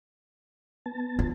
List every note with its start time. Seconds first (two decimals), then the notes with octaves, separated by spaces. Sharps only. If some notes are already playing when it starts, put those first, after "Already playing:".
0.86 B3 A5
1.19 F4